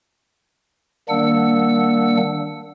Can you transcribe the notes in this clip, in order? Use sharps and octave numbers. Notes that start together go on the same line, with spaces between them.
D#3 G3 A#3 D4 F#5 E6